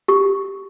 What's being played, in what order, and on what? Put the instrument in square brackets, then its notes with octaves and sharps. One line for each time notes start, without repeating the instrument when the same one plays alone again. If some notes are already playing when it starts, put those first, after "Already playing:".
[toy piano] G4